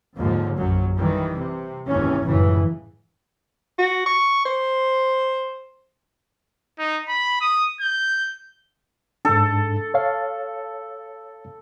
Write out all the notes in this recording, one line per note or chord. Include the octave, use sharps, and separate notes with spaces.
D#2 G#2 D3 F3
A#1 F#2 F#3
D#3 E3 G3
C3
G#1 D#2 C3 E3 C#4
G1 C#2 F#2 A2 C#3 E3
F#4
C#6
C5
D#4
B5
D#6
G6
G#2 D4 A4
C#5 F5